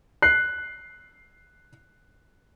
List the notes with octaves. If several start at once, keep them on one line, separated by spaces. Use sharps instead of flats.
F#6 C7